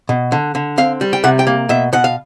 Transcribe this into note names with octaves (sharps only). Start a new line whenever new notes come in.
B2
D3
D3
C4 F5
G3
G5
C3 F#5
G5
A#3
B2 E5
B2 F#5
F5